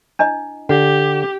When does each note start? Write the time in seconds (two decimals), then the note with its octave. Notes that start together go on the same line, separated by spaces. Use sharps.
0.19 D4 E4 D#5
0.69 D3 G4 F#5